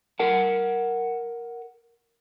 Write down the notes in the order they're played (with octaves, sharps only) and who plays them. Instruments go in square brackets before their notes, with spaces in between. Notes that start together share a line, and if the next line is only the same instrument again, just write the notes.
[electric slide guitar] A#4 F#5 A5